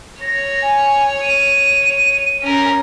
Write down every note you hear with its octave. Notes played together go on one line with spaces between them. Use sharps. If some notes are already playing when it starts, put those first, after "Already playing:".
C#5 A#6
G#5
D#7
C#4 A#4